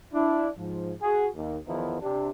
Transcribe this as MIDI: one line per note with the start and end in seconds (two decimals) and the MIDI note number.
0.14 0.49 62
0.14 0.49 64
0.58 0.92 44
0.58 0.92 53
1.01 1.28 66
1.01 1.28 68
1.36 1.57 39
1.67 1.97 40
1.67 1.97 51
1.67 1.97 53
1.67 1.97 59
1.67 1.97 63
1.67 1.97 64
2.01 2.30 48
2.01 2.30 62